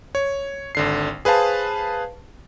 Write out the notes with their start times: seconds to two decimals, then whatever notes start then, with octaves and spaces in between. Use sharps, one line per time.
0.15 C#5
0.75 G#1 D3 C7
1.25 G#4 B4 C5 F5 A5